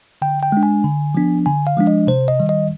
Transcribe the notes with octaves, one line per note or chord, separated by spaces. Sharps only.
D3 G5
G5
G#3 D4
G#5
D3
F3 B3 D4
D3 G#5
F5
F3 G#3 D4
D#5
C3 C5
D#5
D#3 G3
D#5